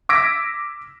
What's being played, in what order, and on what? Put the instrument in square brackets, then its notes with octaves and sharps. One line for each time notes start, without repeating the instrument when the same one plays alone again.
[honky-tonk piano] D6 E6 G#6 A#6 B6 D7